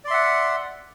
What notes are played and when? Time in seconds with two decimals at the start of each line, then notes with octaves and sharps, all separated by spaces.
0.04 D5
0.07 C6
0.10 E5
0.14 F#5